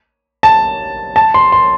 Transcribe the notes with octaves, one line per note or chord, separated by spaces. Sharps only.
A5
A5
C6
C6